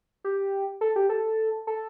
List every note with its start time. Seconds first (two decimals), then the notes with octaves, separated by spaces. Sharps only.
0.24 G4
0.81 A4
0.96 G4
1.09 A4
1.67 A4